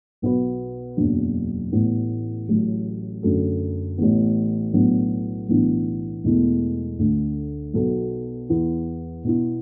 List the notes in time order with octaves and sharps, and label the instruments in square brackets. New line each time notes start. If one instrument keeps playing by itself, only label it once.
[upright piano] B1 B2 B3 F#4 B4
F#1 E2 B2 F#3 D4
A1 A2 E3 B3
A1 A2 F#3
F#2 D3 A3 F#4 A4
A1 A2 E3 B3
B1 A2 F#3 B3 D4
B1 A2 E3 B3 D4
E1 E2 B2 A3 E4
D2 D3 A3
B1 B2 B3 F#4 A4
E2 E3 B3 E4
B2 B3 E4